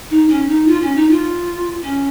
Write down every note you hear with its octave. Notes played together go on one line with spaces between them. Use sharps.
D#4
C#4
D#4
F4
C#4
D#4
F4
C#4